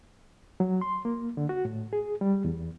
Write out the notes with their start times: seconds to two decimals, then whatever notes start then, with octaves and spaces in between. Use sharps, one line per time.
0.60 F#3
0.81 C6
1.05 A#3
1.37 D3
1.49 F#4
1.65 A2
1.93 G#4
2.21 G3
2.45 E2